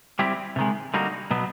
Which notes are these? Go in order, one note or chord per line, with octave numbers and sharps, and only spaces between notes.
G3 C4 E4 G4
C3 D#3 G#3
D3 G3 A#3 D#4 F#4
B2 F#3 B3